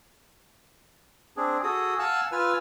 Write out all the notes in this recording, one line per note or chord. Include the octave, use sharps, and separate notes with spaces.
C4 D4 G#4
F#4 G#4 A4 D#6
F5 F#5 G#5 A5 E6 F#6
F4 B4 G#5 E6 F6